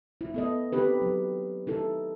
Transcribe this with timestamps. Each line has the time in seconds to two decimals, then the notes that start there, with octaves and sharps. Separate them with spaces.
0.21 E4
0.34 B3 A4 D#5
0.72 C4 D#4 G4 B4
1.02 F#3
1.67 D#4 E4 A4